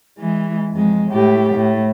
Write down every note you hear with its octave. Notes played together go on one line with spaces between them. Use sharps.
E3 G#3
F2 G#3
A2 G4
A2